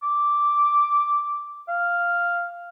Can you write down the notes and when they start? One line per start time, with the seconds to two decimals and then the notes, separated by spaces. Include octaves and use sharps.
0.03 D6
1.68 F5